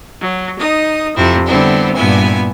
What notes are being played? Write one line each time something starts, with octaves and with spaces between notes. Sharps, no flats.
F#3
D#4 D#6
F2 C3 C4 E4
D3 G3 B3 C4 E4
G2 A#2 B3 E4 G#5